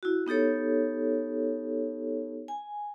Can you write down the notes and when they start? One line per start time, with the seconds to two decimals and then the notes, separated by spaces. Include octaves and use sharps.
0.03 E4 F#4
0.27 B3 D#4 G4 A4 C#5
2.48 G#5